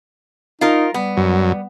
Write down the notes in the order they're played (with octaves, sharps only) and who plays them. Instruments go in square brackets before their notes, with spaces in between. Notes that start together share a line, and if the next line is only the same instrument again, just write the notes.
[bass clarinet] D#4 [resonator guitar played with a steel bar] F4 A#4
[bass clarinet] G3 [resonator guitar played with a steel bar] B3
[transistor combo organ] F#2